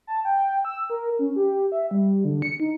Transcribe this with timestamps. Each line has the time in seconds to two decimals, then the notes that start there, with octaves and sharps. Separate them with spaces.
0.07 A5
0.25 G5
0.65 E6
0.90 A#4
1.19 C#4
1.36 G4
1.72 E5
1.91 G3
2.25 D3
2.42 C#7
2.60 D#4